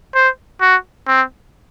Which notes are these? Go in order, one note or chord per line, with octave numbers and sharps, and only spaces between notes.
C5
F#4
C4